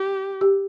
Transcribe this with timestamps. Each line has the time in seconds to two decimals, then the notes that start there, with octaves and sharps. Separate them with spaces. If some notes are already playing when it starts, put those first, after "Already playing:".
Already playing: G4
0.41 G4